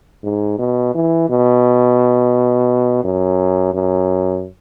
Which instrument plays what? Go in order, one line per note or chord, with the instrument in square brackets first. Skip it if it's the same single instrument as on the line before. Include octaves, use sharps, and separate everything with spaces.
[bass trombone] G#2
B2
E3
B2
F#2
F#2